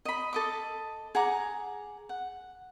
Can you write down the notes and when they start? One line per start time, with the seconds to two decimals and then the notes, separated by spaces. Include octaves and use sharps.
0.05 D#5 B5
0.33 A4 D#5 D6
1.15 G#4 F#5 A#5 D6
2.09 F#5